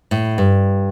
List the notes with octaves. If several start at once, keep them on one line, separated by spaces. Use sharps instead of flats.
A2
G2